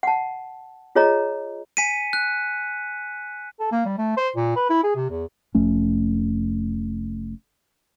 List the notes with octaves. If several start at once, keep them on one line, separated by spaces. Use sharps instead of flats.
F#5 A5
F4 G#4 C#5 D#5 A#5
G#5 B6 C#7 D#7
F#6
A4
A#3
G3
A3
C5
A#2
B4
E4
G#4
C3
E2
F1 F2 A3 C#4